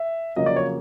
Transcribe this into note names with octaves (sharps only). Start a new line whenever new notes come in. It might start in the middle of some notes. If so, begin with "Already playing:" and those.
Already playing: E5
F2 C#3 F#3 A#3 D#5
D5
C#5